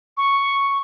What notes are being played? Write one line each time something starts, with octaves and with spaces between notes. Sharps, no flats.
C#6